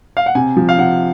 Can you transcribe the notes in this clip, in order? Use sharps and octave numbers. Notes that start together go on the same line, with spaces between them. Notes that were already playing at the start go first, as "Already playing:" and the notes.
F5
F#5
C3 G#5
F3
F5
C3 F#5